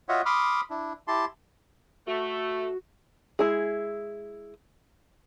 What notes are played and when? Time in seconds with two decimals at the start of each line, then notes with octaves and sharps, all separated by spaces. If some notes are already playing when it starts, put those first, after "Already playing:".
0.09 F4 F#4 C#5 D#5 E5 F#5
0.26 B5 C6 D6 D#6 F6
0.70 D4 E4
1.08 E4 G4 A5 C6
2.07 A3 F#4
3.39 G#3 E4 G#4